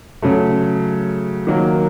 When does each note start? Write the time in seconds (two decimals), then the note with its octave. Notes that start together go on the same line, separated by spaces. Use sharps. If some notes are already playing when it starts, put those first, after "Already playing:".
0.22 C#3 F#3 A3
1.47 D#3 F#3 A#3